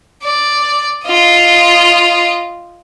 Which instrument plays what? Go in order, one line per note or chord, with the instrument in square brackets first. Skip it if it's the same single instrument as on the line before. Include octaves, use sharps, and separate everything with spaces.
[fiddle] D5
F4 D#5